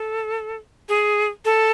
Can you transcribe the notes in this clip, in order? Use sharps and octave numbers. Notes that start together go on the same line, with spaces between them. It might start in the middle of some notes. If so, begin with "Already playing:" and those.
Already playing: A4
G#4
A4